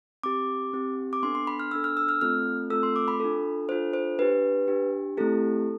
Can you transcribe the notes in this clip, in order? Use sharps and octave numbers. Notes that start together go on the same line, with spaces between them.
C4 G4 D6
C4 G4
D6
B3 D4 A4 C6
C6
B5
F6
B3 D4 A4 E6
F6
E6
F6
A3 C4 F4 A4 F6
A3 C4 F4 A4 E6
C6
D6
B5
D4 F4 A4
D4 F4 A4 C5
C5
D4 G4 B4
D4 G4
A3 C4 E4 G4 A4